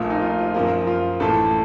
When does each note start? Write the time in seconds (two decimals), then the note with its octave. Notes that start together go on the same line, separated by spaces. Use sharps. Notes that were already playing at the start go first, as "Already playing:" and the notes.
Already playing: A#1 A#2 F3 A3
0.10 D#4
0.21 F4
0.39 F4
0.54 F#2 F3 A#3
0.87 F4
1.20 A1 A2 A3 A4